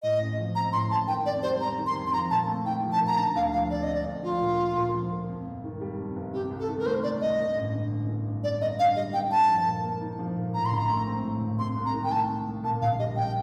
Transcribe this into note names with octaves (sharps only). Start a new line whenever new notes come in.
A2 D#5
A1
F3
C4 A#5
A2 C6
A1 A5
D#3 G5
F2 D5
G3 C5
F2 A#5
D#3
C6
F2
C6
F3 A#5
A#2 A5
A3
D#4 G5
F3
A5
A#2
A#5
D3 A5
D2 F5
F3 F5
C4 D5
D3 D#5
D5
D2
F3 F4
A#2
A#3
A#2
F3
A#2
F2
G1
D#3
G3
F2
G1
C3 G4
C2
A4
D#3
A#4
A3 C5
C3 D5
C2 D#5
G2
A1
D3
A1
G2
A1
G2 D5
G1 D#5
D3 F5
G3 D#5
G2 G5
G1 A5
F3
A#2
A#3
D#4
F3
A#2
A2 A#5
C6
A#1
A#5
A3
C4
A2
A#1
C3 C6
C2
A#5
D#3
G5
A3 A5
C3
C2
A#2 A5
A#1 F5
G3 D#5
A#1 G5